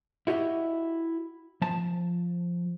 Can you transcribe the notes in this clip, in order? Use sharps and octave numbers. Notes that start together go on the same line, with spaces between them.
E4 F#4 G4 D#5
F3 A5